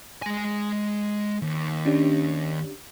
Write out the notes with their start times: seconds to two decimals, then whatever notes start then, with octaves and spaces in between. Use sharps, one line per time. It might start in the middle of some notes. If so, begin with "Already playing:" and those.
0.22 G#3 G#5
1.42 D#2
1.85 C#4 D4 G4